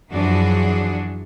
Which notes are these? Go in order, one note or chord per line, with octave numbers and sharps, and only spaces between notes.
F#2 E3 F3 D4 F#4 G#4